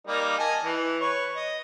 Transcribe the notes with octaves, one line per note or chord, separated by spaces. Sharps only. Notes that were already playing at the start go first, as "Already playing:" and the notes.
G3 A#3 D#4
D#5 G#5 A5
E3
B4 C#5
D#5